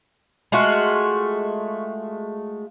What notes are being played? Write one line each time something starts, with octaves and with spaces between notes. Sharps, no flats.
G#3 A3 F4 F#4